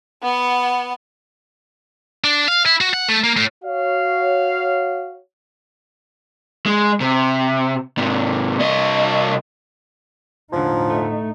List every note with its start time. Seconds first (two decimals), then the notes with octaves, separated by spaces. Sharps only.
0.22 B3 F#5
2.24 D4
2.48 F5
2.66 E4
2.81 F#4
2.94 F#5
3.09 A3
3.24 A#3
3.37 A2
3.64 F#4 C#5 F5
6.66 G#3
7.00 C3
7.98 G#2 C3
8.59 C2 D#5
10.53 E1 A2 D3 F3 D#4
10.90 A3